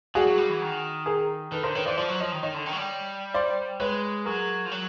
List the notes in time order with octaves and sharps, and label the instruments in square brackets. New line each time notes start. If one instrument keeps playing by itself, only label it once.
[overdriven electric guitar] G3 [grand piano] F#4 G#4
[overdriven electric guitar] F#3
G3
E3
D#3
[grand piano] G#4 A#4
[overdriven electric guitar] D#3 [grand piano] A4 B4
[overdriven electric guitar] D3 [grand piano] A#4 C5
[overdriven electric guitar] D#3 [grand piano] B4 C#5
[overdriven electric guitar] E3 [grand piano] C5 D5
[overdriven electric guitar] F3 [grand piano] C5 D5
[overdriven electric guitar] F#3
[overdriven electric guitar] F3 [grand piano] C#5 D#5
[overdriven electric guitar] D#3
[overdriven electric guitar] D#3 [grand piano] C#5 D#5
[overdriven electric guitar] D3
D#3
F#3
G3
[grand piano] C5 D5
[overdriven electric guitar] G#3 [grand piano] B4 C#5
[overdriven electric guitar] F#3 [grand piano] G#4 A#4
[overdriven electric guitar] F3
F#3